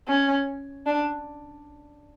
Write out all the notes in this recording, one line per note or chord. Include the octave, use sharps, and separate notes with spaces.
C#4
D4